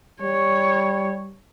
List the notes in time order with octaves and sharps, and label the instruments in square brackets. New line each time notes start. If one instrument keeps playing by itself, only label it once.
[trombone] G3 [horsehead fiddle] C#5